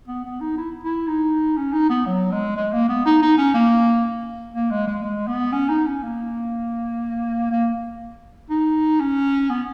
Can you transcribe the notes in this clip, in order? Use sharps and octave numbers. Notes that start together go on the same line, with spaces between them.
B3
B3
D#4
E4
E4
D#4
C#4
D#4
B3
F#3
G#3
G#3
A#3
B3
D#4
D#4
C#4
A#3
A#3
G#3
G#3
G#3
B3
C#4
D#4
C#4
A#3
A#3
D#4
C#4
B3